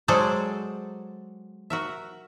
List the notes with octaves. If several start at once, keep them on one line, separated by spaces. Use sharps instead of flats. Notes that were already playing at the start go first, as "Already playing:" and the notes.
F#3 G#3 G#4 A4 C5 D5
F#4 A#4 E5